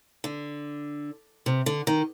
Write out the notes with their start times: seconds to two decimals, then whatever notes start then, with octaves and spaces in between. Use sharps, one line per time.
0.24 D3
1.46 C3
1.66 D3
1.87 D#3